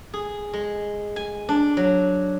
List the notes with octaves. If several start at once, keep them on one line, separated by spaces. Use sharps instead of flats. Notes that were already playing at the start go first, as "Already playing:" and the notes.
G#4
G#3
G#5
D4
F#3